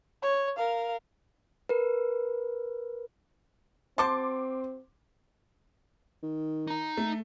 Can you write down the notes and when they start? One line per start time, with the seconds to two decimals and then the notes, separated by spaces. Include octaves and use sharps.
0.23 C#5
0.56 A#4 F5
1.69 A#4 B4
3.98 C4 F#4 C5 A5 C6 D6
6.23 D#3
6.67 D#4 A#5
6.97 A3